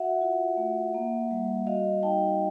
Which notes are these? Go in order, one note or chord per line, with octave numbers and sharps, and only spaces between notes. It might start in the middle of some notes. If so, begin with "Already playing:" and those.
Already playing: F#4 E5 F#5
F4
A3
A#3
G3
F#4 D#5 F5
D#4 G5 A5